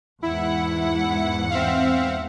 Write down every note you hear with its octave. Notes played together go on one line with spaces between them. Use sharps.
E2 G#2 E4 F#5
C4 E5 F5